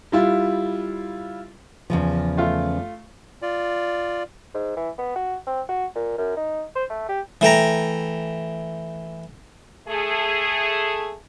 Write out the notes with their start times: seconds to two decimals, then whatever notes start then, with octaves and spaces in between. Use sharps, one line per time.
0.12 G3 E4 F4
1.90 E2 C#3 F3
2.37 A3 F4
3.42 F4 D5
4.54 G#2
4.77 E3
4.98 B3
5.15 F#4
5.47 C4
5.68 F#4
5.95 A#2
6.18 F#2
6.36 D#4
6.76 C5
6.90 A3
7.08 G4
7.41 E3 A3 G5 A#5
9.88 A3 G#4